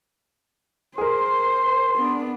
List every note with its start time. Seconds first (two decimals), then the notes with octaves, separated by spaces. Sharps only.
0.98 G#4 A#4 C5 C6
1.95 B3 D4